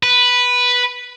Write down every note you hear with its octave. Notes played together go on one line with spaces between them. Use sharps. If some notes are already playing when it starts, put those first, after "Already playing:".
B4